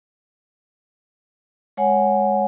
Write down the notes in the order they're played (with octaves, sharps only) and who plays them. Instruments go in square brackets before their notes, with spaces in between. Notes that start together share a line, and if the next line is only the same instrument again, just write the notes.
[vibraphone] G#3 C#5 F#5 G#5